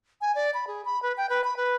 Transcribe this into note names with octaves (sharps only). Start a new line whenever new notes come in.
G#5
D5
B5
G#4
B5
B4
G5
B4
B5
B4